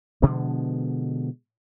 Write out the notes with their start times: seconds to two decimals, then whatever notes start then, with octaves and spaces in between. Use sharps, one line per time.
0.22 B2 D3 F3 G#3